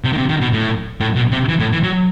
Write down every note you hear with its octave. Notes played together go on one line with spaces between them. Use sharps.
C3
D#3
C3
D#3
B2
A2
A2
B2
C3
E3
A2
E3
F#3